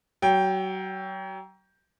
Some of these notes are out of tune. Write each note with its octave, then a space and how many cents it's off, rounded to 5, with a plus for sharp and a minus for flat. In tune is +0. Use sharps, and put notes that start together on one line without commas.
F#3 +30 G5 +0